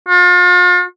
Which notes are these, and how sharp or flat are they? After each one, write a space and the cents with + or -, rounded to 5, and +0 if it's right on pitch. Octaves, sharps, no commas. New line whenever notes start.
F4 +40